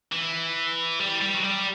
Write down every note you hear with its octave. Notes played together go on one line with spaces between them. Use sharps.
E3
G3
G3
F#3
G3